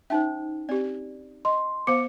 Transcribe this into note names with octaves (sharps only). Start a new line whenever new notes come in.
C#4 D#4 C5 E5
C4 G4 D5
D#5 C6
B3 C5 F5 D6 C#7